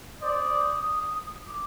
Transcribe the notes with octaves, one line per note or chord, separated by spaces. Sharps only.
C5 D5 D#6
D6